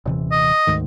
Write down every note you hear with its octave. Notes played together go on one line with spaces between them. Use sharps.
D#1 C3 E3
D#5
D2 G#2 D#3